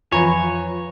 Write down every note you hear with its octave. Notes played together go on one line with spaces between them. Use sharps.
F2 E3 F3 F4 B4 C#5 G#5 A#5